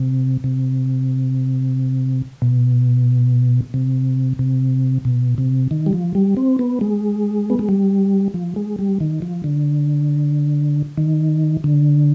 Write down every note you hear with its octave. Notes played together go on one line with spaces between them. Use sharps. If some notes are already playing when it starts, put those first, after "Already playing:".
Already playing: C3
C3
B2
C3
C3
B2
C3
D#3
G3
F3
G3
C4
B3
G#3
B3
G#3
G3
F3
G#3
G3
D#3
F3
D3
D#3
D3